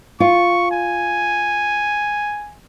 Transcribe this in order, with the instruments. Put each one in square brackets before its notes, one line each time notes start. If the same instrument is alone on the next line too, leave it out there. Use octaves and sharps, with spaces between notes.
[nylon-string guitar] F4 [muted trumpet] C#6
[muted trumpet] G#5